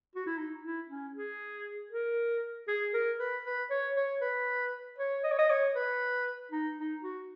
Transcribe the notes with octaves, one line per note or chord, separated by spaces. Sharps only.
F#4
E4
D#4
E4
C#4
G#4
A#4
G#4
A#4
B4
B4
C#5
C#5
B4
C#5
D#5
C#5
D#5
C#5
B4
D#4
D#4
F#4